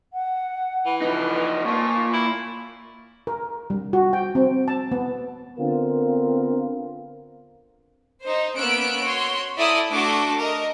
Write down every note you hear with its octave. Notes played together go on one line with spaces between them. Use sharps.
F#5
E3
F3 D#4 B4
A#2 F3 A#3 C#6
E4
A#4
G3
F#4
G5
C4
A5
B3
D3 B3 C4 F4 A#4
D#4 C5
A#3 B3 C#4 E6 F#6 D7
F#4 C#5 C6
E4 A4 D5 A#5 D#6
A3 D4 F#4 A4 A5 D6
A#4 D#5